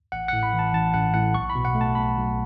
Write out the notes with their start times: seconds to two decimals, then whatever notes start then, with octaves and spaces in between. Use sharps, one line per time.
0.12 A1 F#5
0.28 A2 F#5
0.43 B5
0.53 E3
0.59 A5
0.74 A1 A5
0.94 A1 F#5
1.14 A2 F#5
1.34 B1 C#6
1.50 B5
1.55 B2
1.65 F#5
1.75 A3
1.81 A5
1.95 B1 B5
2.16 B1